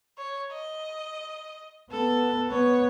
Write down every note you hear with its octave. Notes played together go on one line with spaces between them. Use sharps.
C#5
D#5
B3 A4
B3 C#5